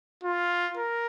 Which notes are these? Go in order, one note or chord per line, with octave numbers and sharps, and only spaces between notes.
F4
A#4